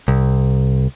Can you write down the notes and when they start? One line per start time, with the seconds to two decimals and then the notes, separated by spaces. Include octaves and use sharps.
0.08 C2